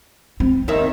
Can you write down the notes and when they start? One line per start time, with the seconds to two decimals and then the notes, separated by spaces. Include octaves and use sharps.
0.40 C4
0.68 D#2 D#3 E5